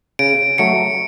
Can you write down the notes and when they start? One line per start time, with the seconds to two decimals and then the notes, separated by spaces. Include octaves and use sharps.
0.19 C#3 D7
0.58 F#3 A3 C#7